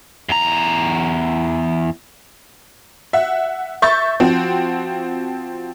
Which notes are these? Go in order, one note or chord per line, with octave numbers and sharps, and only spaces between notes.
E2 A#5
E5 F#5
E5 C#6 G6 A6
F3 C4 F#4